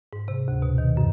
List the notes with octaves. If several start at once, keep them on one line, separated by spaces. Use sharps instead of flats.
G#2
C3
D2
B2
D#3
F#2